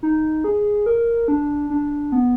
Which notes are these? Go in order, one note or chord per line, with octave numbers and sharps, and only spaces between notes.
D#4
G#4
A#4
D4
D4
B3